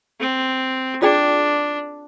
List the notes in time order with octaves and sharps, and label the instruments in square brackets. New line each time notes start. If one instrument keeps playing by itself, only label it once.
[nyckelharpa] C4
[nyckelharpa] D4 [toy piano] F4 G#4 D5 G5